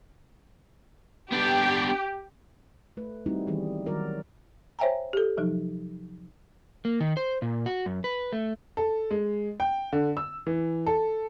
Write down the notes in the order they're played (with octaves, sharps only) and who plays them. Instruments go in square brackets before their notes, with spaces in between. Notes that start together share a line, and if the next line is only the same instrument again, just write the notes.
[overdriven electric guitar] B3 D4 [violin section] G4
[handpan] A3 B4
G3 A3 C4 D#4 E4 F#4
D#3 E3 G3 B3 G#4
D#3 F#3 G3 F#4 A#4 D5
[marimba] C5 C#5 E5 G5 G#5 A#5
G4 A4
C3 F3 F#3 D#4
[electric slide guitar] A#3
D#3
C5
A#2
F#4
F#2
B4
A3
[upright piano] A4
G#3
G5
D3
E6
E3
A4